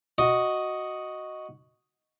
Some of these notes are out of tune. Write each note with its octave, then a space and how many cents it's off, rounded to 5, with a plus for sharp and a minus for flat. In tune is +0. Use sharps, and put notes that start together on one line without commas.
F#4 +0 D#5 +0